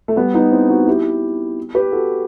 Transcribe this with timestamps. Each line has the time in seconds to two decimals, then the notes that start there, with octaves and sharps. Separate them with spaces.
0.08 A3
0.16 G3 B3
0.34 B3 D#4
0.51 C4 E4
0.69 D#4 F#4
0.87 E4 G4
1.75 G4 B4
1.92 F#4 A4